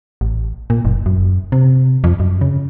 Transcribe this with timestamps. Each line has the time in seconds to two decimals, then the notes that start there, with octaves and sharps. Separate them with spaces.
0.21 A1
0.70 A#2
0.85 F#1
1.06 F#2
1.52 C3
2.04 F2
2.20 F#2
2.41 C#3